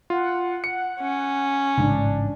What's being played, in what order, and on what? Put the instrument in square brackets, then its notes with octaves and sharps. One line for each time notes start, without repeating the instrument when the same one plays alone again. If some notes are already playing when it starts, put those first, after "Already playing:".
[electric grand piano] F4 [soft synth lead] F#5
[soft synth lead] F#5 [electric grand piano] C#7
[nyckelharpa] C#4
[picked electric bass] A1 G#2 C#3 [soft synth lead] D4